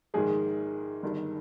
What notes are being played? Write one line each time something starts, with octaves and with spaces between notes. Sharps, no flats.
A#1 G#2 D#3 G#3 G#4
G1 G2 D#3